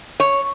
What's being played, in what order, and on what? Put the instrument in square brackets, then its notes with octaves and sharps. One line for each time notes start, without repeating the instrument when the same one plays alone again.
[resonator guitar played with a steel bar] C#5